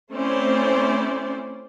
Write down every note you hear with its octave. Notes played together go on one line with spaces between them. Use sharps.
A3 C4 C#4 E4 C5 D5